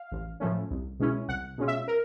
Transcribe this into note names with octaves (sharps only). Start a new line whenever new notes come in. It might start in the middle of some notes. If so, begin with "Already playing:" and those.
Already playing: F5
A1
A2 F3 A3 C#4
C2
B2 G#3 C#4 E4
C2 F#5
B2 G#3 C#4 F4
E5
A#4